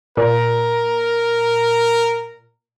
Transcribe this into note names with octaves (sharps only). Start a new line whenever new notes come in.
A#2 A#4